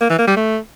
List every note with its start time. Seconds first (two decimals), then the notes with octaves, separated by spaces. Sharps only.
0.01 A#3
0.10 E3
0.19 A#3
0.28 G3
0.37 A3